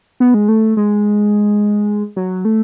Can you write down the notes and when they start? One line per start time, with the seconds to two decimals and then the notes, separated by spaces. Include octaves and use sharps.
0.20 B3
0.34 G#3
0.48 A3
0.77 G#3
2.17 F#3
2.45 A3